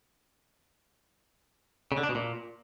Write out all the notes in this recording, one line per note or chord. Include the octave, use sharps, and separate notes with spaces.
C#3
D3
D4
B2
A#2